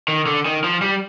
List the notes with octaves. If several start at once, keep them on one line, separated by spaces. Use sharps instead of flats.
D#3
D3
D#3
F3
G3